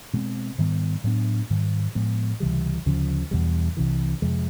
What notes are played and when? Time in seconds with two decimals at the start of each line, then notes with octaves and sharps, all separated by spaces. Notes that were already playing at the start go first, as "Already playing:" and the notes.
0.13 B2 G#3 C4
0.58 G#2 D#3 G3 B3
1.04 A2 F#3 B3 D4
1.50 G#2 D#3 G3
1.95 A2 F3 G#3 B3
2.40 C#2 C3 E3 G3
2.86 D2 C#3 F3
3.31 E2 B2 G3
3.77 C2 C3 E3
4.22 F2 C3 F3 G#3